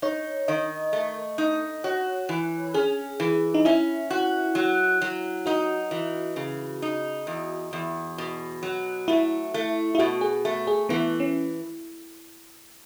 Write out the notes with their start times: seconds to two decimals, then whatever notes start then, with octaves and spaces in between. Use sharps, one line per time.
0.02 D#4 C#5
0.48 D#3 D#5
0.93 A3
1.38 D#4
1.84 F#4 C#5
2.29 E3
2.74 C#4 G#4
3.20 E3
3.54 D#4
3.65 C#4 E4
4.10 F#4
4.55 F#3
5.02 F#3
5.46 D#4 F#4
5.91 E3
6.36 C#3
6.82 D#4
7.27 E2
7.73 E2
8.18 B2
8.63 F#3
9.08 A3 E4
9.54 A3
9.95 E4
9.99 B2 F#4
10.21 G#4
10.45 A3
10.67 G#4
10.89 E3 B3
11.20 C#4